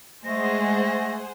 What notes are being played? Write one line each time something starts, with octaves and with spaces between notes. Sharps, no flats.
G#3 A3 G#4 C5 F#5 A#6